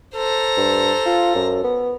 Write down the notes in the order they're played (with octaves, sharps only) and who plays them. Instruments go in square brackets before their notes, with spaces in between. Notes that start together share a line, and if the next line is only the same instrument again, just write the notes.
[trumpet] A4 [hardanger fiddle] C5 A#5
[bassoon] G2
F4
F#2
B3